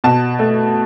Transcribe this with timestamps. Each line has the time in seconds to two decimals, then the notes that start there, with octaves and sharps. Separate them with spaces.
0.04 B2 A5
0.39 A3